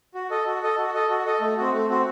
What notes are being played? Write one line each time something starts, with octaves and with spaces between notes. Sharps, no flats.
F#4
A4 D#5
F#4
A4 D#5
F#4
A4 D#5
F#4
A4 D#5
A3
C4 F#4
A3
C4 F#4